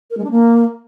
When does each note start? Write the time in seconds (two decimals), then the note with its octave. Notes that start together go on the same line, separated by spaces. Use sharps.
0.10 A#4
0.17 G#3
0.24 D4
0.31 A#3